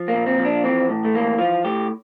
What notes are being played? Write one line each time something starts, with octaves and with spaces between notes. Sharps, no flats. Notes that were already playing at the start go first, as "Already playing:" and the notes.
Already playing: F3
A#3
A#2
C4
F3
D4
E3 C4
A2
A3
E3 A#3
F3 F4
A2 G4